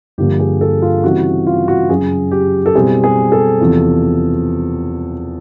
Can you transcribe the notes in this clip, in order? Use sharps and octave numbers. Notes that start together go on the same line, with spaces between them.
G2 D3 F3 A#3 G4
G#4
A4
F4
C#3 E3 G3 C4 F#4
F4
F#4
F#2 C#3 F#3 G#4
G4
A4
B2 G3 C4 E4 G#4
G#4
A4
E2 C3 F3